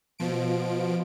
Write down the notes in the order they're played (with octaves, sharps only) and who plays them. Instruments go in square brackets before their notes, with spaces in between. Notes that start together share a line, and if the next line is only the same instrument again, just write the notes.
[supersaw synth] B2 F3 D7